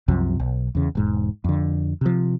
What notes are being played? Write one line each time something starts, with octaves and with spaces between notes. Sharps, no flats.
C2 F#2 C3 F3
B1
E2 C#3
E1 G#2
F2 D3
C3 F3